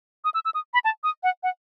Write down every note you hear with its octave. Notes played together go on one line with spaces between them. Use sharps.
D#6
E6
E6
D#6
B5
A5
D#6
F#5
F#5